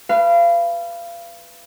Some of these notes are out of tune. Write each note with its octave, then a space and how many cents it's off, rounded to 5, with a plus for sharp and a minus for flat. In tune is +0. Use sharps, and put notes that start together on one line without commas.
B4 +0 F5 -30